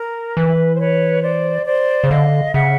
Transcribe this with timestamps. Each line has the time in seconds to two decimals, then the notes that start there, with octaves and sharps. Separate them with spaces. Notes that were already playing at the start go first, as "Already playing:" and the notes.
Already playing: A#4
0.36 E3 B4
0.76 C5
0.80 B4 C#5
1.23 C5 D5
1.67 C5 D5
2.04 C#3
2.10 D3 D#5 F5
2.54 C#3 E5 F#5